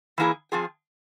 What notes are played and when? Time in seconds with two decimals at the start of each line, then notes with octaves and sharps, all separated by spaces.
0.18 E3 A#3 E4 G#4
0.52 F3 C4 F4 G#4